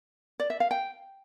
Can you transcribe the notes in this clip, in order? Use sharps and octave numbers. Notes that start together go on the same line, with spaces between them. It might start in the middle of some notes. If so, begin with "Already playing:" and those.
D5
E5
F5
G5